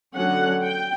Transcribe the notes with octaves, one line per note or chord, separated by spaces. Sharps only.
D3 F#3 C#4 F#5
G5